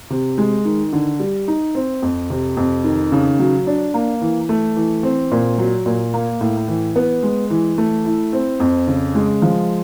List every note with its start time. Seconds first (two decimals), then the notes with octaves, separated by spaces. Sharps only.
0.10 C3
0.38 G#3
0.65 D#3
0.93 D3
1.20 G3
1.48 D#4
1.75 C4
2.02 F2
2.30 C3
2.57 F2
2.84 D#3
3.12 C#3
3.39 F#3
3.67 D4
3.94 A#3
4.21 E3
4.49 A3
4.76 E3
5.03 C4
5.31 A#2
5.58 F#3
5.86 A#2
6.14 A#3
6.41 A2
6.68 E3
6.96 B3
7.23 G#3
7.50 E3
7.78 A3
8.05 E4
8.33 C4
8.60 F2
8.87 C#3
9.15 G#3
9.42 F3